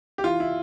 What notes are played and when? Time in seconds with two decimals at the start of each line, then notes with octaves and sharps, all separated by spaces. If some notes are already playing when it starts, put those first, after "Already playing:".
0.18 G4
0.24 E3 F4
0.40 E4